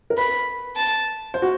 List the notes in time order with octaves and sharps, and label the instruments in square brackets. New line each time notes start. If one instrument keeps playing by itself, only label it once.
[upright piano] A#4
[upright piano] B4 [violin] B5
[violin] A5
[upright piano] C5
F#4